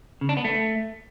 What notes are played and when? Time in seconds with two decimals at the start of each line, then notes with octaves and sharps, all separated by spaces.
0.21 C#3
0.29 D4
0.37 B3
0.45 A3